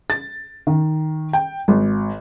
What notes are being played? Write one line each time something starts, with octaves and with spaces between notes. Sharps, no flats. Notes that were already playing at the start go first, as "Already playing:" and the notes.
A6
D#3
G5
G#1